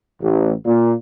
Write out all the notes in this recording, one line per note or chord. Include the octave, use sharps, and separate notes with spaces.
A1
A#2